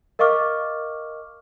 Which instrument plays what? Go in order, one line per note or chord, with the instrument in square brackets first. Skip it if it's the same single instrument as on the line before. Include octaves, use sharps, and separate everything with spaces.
[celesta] A#4 D#5 F5 C#6 D6 F6